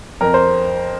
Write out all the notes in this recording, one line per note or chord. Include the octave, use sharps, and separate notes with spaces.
F2 A#4
C5